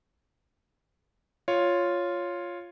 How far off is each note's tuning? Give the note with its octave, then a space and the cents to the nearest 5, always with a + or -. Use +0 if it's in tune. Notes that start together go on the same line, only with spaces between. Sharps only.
F4 +0 C#5 +0